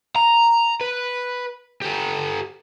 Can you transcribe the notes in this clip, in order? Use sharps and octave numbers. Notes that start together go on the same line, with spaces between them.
A#5
B4
G4 A4